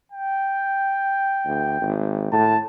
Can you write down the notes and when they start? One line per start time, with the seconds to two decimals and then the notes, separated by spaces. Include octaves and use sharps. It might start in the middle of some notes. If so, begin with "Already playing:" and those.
0.12 G5
1.46 D2
1.82 G#1
2.32 A2 A5